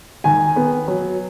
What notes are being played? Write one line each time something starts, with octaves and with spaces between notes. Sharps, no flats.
D#3 G#5
B3
F#3